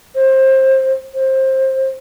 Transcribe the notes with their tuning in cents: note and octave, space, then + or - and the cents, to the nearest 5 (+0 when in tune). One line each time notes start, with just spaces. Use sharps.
C5 +20
C5 +20